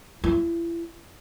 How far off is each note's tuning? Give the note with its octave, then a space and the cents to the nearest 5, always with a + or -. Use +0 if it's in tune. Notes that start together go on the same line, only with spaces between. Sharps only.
E4 +35